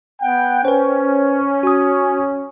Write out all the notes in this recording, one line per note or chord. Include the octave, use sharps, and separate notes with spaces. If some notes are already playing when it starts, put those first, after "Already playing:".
B3 F#5 G5
C#4 B4 C5
F#4 D#6